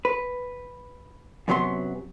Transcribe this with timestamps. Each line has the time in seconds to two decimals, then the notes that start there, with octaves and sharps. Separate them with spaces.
0.05 B4
1.48 F#2 C3 F#3 B3 C6